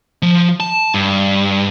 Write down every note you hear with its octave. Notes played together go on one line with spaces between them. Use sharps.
F3
A5
G2